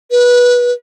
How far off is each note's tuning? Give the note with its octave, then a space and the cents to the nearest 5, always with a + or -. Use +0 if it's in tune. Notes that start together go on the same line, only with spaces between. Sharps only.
B4 -20